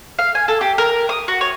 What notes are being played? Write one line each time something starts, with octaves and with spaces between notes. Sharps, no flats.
F5
G#5
A4
G4
A#4
D#6
F#4
C#5